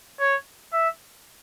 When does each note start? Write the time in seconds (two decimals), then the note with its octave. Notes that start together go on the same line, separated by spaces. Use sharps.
0.19 C#5
0.73 E5